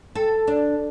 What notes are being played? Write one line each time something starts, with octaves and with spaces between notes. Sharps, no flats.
A4
D4